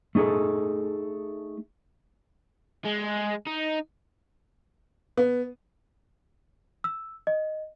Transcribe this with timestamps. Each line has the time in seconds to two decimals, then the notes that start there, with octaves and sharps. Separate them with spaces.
0.15 A3 D#4 F4 G#4 A4
2.86 G#3
3.47 D#4
5.17 B3
6.84 E6
7.27 D#5